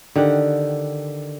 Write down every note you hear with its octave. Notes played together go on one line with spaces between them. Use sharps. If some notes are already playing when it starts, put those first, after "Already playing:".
D3 D#3 G4 F#5